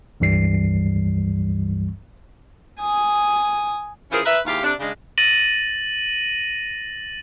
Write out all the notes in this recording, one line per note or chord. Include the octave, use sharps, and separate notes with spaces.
C#2 G2 E3 G3 C7
G#5 D#6
E3 C#4 F4 G#4 A#4 C5
A#4 B4 E5
D#2 G#2 E4 G4 F5
C3 D4
C#3 G#3 D4
A6 A#6 D#7 F#7